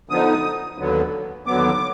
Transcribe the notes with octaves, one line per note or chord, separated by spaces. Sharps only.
D3 F3 B3 D#4 D#6
D#2 D3 F#3 B3
D#2 D3 F#3 B3 D6